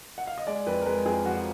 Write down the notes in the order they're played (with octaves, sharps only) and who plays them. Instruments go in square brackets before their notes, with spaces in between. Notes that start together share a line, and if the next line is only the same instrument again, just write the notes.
[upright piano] F#5
F5
D#5
G#3 D5
F2 B4
A#4
G#3 B4
F2 G#4
F3 F#4